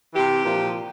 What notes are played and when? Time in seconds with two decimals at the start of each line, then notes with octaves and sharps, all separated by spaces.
0.14 C3 E3 G4
0.44 A#2 F3